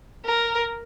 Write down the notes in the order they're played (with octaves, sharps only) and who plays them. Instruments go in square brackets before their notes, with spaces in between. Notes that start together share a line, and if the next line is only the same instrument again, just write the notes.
[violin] A#4